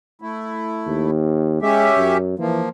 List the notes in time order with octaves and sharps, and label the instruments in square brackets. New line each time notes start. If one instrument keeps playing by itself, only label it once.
[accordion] A3 E4
[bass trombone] D#2
[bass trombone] G#3 [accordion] C#4 G4 E5
[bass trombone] F#2
[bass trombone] E3 [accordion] F3 A#3